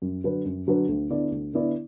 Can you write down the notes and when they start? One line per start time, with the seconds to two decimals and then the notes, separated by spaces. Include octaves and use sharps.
0.02 F#2
0.24 D3 F#3 D4 B4
0.45 F#2
0.67 D3 F#3 D4 B4
0.89 D2
1.10 D3 B3 E4 D5
1.32 D2
1.53 D3 B3 E4 D5